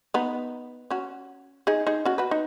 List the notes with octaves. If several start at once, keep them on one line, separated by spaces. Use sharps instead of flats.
B3 D#4
C#4 F#4
D#4 G#4
D#4 G#4
C#4 F#4
F#4 B4
D#4